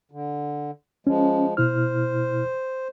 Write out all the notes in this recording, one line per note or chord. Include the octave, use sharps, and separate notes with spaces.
D3
F3 G#3 C#4
B2 E4 C5 F6